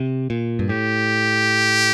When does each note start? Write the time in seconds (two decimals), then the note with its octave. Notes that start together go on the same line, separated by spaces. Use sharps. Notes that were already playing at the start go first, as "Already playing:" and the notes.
Already playing: C3
0.30 A#2
0.59 G2
0.69 A2 G4